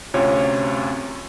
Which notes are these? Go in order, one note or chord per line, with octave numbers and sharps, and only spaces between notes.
D2 C3 C#4 F4 C#5